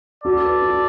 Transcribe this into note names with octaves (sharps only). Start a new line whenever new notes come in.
F#4 A4 D5
B4
F#4